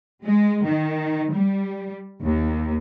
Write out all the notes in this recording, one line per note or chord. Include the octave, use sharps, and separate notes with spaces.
G#3
D#3
G3
D#2